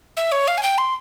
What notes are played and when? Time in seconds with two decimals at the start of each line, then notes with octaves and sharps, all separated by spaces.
0.17 E5
0.32 C#5
0.48 F5
0.58 G#5
0.63 G5
0.78 C6